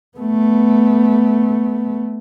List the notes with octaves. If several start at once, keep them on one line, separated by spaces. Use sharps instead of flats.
A3 B3